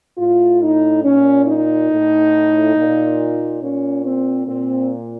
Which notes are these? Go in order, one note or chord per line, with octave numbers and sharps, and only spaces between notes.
A2 F4
D#4
A#2 C#4
D#4
A2
A#2
A#2 C#4
C4
A#2 C4